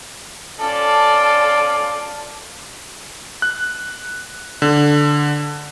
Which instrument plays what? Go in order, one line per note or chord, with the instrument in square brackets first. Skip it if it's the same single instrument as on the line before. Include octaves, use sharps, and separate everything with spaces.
[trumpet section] C#4 F4 D5 [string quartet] A4
[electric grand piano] F#6
D3